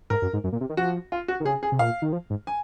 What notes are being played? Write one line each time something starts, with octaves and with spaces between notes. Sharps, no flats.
G#2 A#4
F#2
G#2
F#2
A#2
C3
D#3
F3 F#4
F4
F#4
D#3
C#3 G#4
G#4
C3
A#2 F5
D#3
F3
G#2
G#5